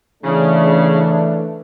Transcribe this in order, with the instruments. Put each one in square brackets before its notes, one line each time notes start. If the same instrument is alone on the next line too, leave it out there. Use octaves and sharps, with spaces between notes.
[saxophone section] C#3 [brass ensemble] E3 A3 D4